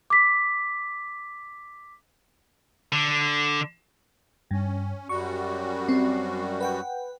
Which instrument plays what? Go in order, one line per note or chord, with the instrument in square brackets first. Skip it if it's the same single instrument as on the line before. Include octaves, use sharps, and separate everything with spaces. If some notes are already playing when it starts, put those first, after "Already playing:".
[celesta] D6 B6
[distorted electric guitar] D3
[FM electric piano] G2 [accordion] C#4
[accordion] F#2 G3 F#4 [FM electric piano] C#6
[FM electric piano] C4
B4 F#5 G5